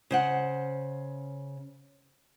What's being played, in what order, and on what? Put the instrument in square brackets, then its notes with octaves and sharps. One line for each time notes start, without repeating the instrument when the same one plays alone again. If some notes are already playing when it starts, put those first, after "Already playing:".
[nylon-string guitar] C#3 C5 F#5